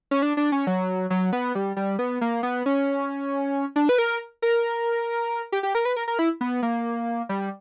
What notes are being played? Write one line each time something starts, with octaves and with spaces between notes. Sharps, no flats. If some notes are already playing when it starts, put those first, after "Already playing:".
C#4
D4
D4
C#4
F#3
F#3
B3
G3
G3
B3
A#3
B3
C#4
D4
B4
A#4
A#4
G4
G4
A#4
B4
A#4
A#4
E4
B3
A#3
G3